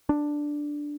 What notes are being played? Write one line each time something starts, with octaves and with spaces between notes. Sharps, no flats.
D4